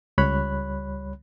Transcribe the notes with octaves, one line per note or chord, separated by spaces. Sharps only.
C#2 G3 C#5 B5 F#6